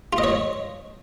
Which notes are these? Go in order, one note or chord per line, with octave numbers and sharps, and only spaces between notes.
F4
D#5
C#5